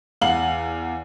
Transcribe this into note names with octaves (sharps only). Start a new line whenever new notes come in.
E2 F5 F#5 F#7